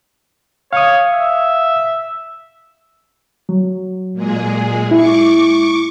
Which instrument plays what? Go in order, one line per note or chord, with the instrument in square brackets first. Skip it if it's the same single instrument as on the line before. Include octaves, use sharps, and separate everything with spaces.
[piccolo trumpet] C#5 [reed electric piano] F5 D#6
[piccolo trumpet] E5
[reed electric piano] F#3
[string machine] A#2 G#3 G#4
[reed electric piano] E4 [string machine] C#6 D6